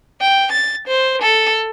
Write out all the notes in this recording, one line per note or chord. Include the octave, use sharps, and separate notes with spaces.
G5
A6
C5
A4